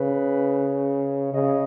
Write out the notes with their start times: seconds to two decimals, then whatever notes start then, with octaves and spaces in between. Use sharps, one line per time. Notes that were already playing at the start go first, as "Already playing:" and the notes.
Already playing: C#3 B4
1.34 C#3 D#5